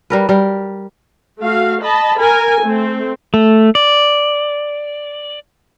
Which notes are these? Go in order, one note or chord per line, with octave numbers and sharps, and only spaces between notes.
G3 A#4 B4
G3 A#4
A3 F#4 F5
D#5 A5 B5
A#4 G#5
A3 C4
A3
D5